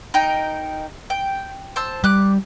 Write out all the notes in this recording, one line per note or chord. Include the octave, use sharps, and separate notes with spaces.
D#4 A#4 G5
G5
C5 A5 E6
G3 D6 F#6